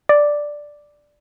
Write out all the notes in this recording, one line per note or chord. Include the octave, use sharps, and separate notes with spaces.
D5